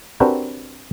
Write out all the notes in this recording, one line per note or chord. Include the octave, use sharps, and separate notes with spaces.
C4 D4 F#4 G4 A#4 B4